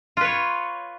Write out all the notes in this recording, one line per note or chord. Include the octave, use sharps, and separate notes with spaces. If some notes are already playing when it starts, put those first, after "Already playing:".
F4 B4 C#5